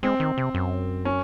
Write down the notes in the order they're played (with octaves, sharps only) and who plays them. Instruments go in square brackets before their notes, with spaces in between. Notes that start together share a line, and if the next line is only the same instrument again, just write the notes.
[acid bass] G#3 [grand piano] C4
[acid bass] D#3
C3
F#2
[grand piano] C#4